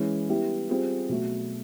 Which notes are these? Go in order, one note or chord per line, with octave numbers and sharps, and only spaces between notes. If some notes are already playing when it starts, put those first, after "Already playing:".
Already playing: E3 G#3 C#4
G3 B3 E4 G4
G3 C4 F4 G#4
B2 F#3 A3